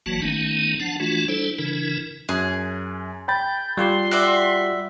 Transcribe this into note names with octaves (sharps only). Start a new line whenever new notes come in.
G1 E3 F#3 A#3 F#4 A5
D#3 A3 B3 C#4 D#4
F3 D4 F#5 A5
E3 A3 D4 F4 F#4
G3 D4 E4 A4 C5
C#3 E3 D4 E4 A#4
F#2 G#4 F#6
G5 B5 G6 A6
G3 F4 G4 C6
F#4 D5 E5